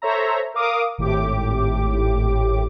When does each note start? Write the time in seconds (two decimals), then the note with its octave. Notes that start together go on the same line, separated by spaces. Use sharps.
0.02 A4 C5 C#5 E5 A#5
0.54 A#4 F5 D6 D#6
0.98 G#1 A2 G4 D6